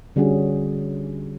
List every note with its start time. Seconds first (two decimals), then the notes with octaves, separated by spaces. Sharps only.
0.16 D3 G3 C#4 F#4 G#4